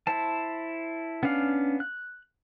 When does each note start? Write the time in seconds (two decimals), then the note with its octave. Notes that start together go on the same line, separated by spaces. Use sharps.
0.07 E4 C5 A5
1.23 B3 C#4 D4 F5
1.80 F#6